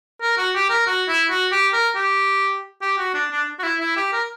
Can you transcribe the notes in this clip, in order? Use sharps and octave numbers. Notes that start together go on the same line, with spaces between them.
A#4
F#4
G4
A#4
F#4
E4
F#4
G4
A#4
G4
G4
F#4
D4
D4
F#4
E4
E4
G4
A#4